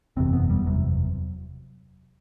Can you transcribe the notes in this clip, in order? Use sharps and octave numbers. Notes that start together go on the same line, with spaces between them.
F#1 E2 C3 C4
B3
G3
F#1 E2 C3 F#3